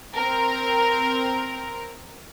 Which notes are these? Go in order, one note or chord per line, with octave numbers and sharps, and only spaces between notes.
C4 A#4